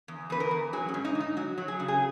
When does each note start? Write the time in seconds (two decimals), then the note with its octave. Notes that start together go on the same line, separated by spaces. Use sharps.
0.08 E2
0.30 E2 B4
0.40 A#4
0.51 E2
0.73 F#3 G#4
0.89 C#4
0.94 G#2
1.05 D#4
1.15 G#2
1.20 D#4
1.37 F#3 F#4
1.58 F#3
1.68 G#4
1.80 C#3
1.88 G#4